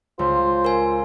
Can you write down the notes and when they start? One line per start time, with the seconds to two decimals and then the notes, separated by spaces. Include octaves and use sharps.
0.19 C#2 F4 C5
0.65 A#4 G#5